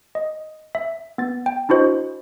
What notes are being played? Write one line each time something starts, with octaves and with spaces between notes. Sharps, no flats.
D#5
E5
B3 A6
G5
D4 E4 F#4 C5 D#5